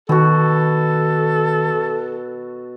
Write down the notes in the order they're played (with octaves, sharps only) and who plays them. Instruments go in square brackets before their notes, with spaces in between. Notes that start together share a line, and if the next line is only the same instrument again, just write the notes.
[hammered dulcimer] B2 F#4 [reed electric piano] D#3 [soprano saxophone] A4